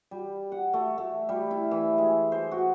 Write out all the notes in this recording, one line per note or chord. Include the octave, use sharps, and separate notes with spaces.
G3
F#5
A3
A3
G3
E4
E3
G#3
C5
F#4